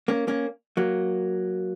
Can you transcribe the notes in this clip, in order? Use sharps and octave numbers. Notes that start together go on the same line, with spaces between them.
A#3 C#4
A#3 C#4
F#3 A#3